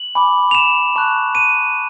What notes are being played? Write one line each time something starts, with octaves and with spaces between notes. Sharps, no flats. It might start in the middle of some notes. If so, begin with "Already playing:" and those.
Already playing: F#7
G#5 B5 D6
F7
E7
A5 C#6 F#6
D#7